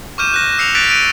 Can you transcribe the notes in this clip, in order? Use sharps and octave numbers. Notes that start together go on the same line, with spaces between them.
C#6 D6 F6 G6 D#7 E7
F#6 A#6 E7
E6 C7 C#7 E7 F7
F#6 A6 B6 D7 F7
E6 D7 D#7